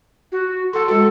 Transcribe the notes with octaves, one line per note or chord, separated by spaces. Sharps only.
F#4
A4 F#5 C6
G#3 F#4 A4